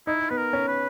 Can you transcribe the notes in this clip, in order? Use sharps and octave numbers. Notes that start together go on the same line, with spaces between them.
D#4 E4
B3 B4
A#4
C#4
B4